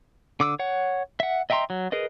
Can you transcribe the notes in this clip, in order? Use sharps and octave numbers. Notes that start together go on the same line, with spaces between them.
D3 D6 E6
C#5 F#5
E5 F#5
D#5 E5 G5 A#5 C6
F#3
G#4 A#4 B4 D#5